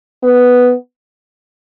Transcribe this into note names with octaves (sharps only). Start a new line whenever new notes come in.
B3